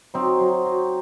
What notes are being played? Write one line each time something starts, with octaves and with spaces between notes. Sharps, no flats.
F#3 C4 D#4
F#3
F#3